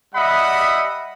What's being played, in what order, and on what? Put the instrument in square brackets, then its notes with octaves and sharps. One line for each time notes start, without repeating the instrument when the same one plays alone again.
[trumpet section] G3 D#5 E5 F#5 B5 D#6